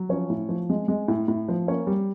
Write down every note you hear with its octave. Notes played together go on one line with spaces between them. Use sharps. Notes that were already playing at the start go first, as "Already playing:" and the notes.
Already playing: F#3
F3 C#4 C#5
A2
F3
G#3
G#3
A2
A2
F3
A#3 C#4 C#5
G3